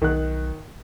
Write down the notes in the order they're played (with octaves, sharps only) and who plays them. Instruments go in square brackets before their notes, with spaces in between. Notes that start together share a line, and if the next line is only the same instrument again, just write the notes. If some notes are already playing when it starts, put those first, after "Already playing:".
[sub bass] B1 [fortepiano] D#3 F#6